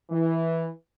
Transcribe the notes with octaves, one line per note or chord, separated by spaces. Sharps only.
E3